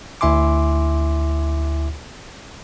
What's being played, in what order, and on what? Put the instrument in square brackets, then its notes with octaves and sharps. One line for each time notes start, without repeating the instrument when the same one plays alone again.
[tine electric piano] D2 E4 E5 G#5 C6 D6